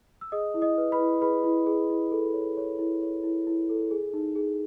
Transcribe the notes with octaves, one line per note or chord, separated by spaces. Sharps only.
E6
G#4 D#5 D#6
E4
D#5 D#6
B4
B4 B5
E4
G#4 B4 B5
E4
G#4
E4
A4
C#5
C#5
E4
C#5
E4
E4
A4
G#4
D#4
G#4